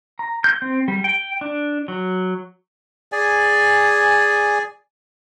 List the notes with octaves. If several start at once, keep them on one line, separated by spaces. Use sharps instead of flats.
A#5
G6
C4
G3
G5
D4
F#3
G#4 D5 G#5